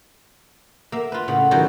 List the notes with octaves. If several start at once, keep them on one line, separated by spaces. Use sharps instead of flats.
A#3 E5
F4 B4
A2 C#3 F#5
D#3 E3 F#3 G3 F#4 A4